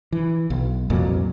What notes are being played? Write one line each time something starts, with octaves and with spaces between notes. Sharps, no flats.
E3
B1
C2 F2 A#2 F#3